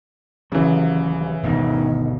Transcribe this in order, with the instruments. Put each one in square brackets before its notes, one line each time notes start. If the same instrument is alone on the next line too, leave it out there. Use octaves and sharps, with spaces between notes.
[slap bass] D#1 F#3 [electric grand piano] C#3 E3
[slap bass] G1 D2 G#2 [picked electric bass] B2 [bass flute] D#3